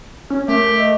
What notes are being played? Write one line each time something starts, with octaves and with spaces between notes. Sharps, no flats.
C#4 C#5
A3 G4 A#4
D#5